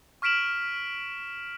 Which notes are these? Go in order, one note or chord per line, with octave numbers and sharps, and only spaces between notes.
C#6 F6 B6 D7 E7 F#7